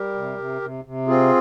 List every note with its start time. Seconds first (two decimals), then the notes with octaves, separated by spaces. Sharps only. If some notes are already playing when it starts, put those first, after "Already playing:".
Already playing: G3 G4 A#4
0.15 C3
0.38 C3
0.62 C3
0.85 C3
1.07 C4 F4 G#4